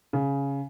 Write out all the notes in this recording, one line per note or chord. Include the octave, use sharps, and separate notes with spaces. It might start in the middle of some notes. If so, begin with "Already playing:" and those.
C#3